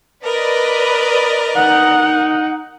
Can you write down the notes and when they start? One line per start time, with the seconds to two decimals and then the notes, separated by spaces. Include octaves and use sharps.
0.23 A#4 B4 D5 D#5
1.56 D#4 F#5